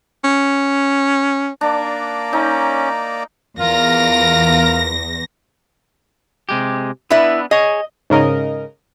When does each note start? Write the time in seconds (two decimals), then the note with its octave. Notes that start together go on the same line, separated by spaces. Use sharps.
0.24 C#4
1.61 A#3 D4 D5 A#5
2.33 C#4 D#4
3.59 E2 F4 A#4 A#6
6.49 C3 G#3 G4
7.11 B3 D4 E4 B4 E5
7.51 G#4 C#5 D#5
8.10 G#2 C#3 A#4 D#5